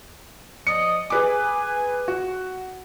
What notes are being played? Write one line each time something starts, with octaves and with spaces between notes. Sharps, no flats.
F3 D5 D#5 C#7
G#4 B4 G#5 D6
F#4